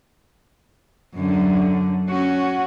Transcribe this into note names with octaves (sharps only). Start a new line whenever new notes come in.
F#2 D3
C#4 F#4